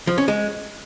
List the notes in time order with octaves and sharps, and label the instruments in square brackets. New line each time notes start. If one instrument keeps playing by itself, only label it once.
[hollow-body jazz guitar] F3
C#4
G#3